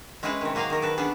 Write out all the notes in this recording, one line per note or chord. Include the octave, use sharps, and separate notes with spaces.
G#3 C#4 E4 G#4 B4
C3 D#3
F#3 A#3 G#4 F5 G#5
D#3 A#4
A4 B4
B3 C#4 D4 G#4